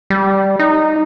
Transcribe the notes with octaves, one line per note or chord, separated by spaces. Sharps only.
G3
D#4